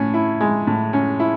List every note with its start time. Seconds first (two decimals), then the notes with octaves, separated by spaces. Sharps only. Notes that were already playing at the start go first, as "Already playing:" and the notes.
Already playing: A2 C#4
0.14 E4
0.41 G#3
0.67 A2
0.93 C#4
1.20 E4